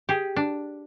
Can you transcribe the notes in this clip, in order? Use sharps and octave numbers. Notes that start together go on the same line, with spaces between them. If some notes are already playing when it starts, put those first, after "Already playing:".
G4 G#4
D4